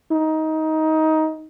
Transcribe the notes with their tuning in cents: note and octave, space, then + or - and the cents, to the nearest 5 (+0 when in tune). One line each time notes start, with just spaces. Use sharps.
D#4 +20